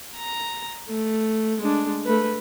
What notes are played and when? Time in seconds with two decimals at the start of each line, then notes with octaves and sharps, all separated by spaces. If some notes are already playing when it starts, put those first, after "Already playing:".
0.16 A#5
0.89 A3
1.61 G#3 D4
2.05 A3 B4